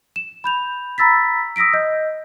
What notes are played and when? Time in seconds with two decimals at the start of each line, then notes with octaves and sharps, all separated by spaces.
0.16 E7
0.44 B5 G6 F7
0.98 A#5 B5 E6 A6 B6
1.56 D#6 E6 A#6 B6 D7
1.74 D#5 G6